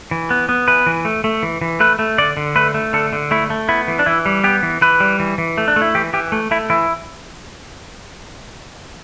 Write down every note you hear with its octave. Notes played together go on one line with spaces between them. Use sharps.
E3
B3
B3
E3 B4
E3
A3
A3
E3
E3
A3 B4
A3
D3 D5
D3
A3 B4
A3
D3 A4
D3
A3 E4
A3
B3 E4
E3
D4
E3 E4
G3
B3 G4
E3
E3 B4
G3
E3
E3
A3
D4
A3
E4
E3 G4
E3 G4
A3
A3 E4
E3 E4